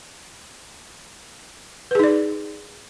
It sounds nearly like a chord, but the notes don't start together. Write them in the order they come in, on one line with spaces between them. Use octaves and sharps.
B4 G#4 D#4 D5